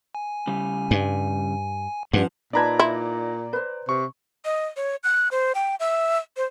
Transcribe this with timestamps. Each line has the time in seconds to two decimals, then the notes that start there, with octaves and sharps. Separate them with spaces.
0.15 G#5
0.47 C#3 G3
0.91 G2
2.13 G2 F3 C#4 B4 F#5
2.53 A#2 D#4 B4 D5 A5 A#5 G#6
2.79 E4
3.53 B4 C5
3.89 C3 C#6
4.45 D#5
4.77 C#5
5.04 F#6
5.31 C5
5.55 G5
5.80 E5
6.37 C5